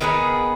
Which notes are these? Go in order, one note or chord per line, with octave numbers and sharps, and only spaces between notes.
D#3 B3 G#4 B4